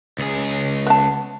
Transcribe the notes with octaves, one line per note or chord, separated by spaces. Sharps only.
C#2 G#4
B3 A5